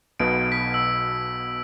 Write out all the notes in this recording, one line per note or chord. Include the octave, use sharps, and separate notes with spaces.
B1 B2 B3 D7
B6
E6